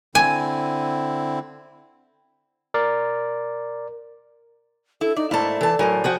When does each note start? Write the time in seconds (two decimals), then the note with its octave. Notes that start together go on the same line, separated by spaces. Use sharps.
0.15 D3 C4 E4 G#5
2.74 A#4 D5
5.01 E4 A4
5.16 D#4 D5
5.31 G#2 A3 A#3 E4 D5 A5
5.61 E3 A4 A5
5.79 A2 F#3 A#4 C5 G#5
6.04 F3 F#4 G#4 F#5 G5